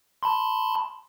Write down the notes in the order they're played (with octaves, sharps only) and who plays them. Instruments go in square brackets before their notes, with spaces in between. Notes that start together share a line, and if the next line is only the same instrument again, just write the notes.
[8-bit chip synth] A5 B5 C6